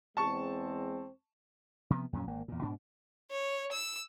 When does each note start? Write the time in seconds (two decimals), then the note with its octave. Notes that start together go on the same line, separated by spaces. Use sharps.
0.17 E2 G#3 C4 A5 C#6
1.90 C3 F3 B3
2.13 F2 A#2 F#3 C#4
2.27 G#1 A#3
2.48 E2 A#2
2.62 G#2 B2 D4
3.31 C#5
3.72 E6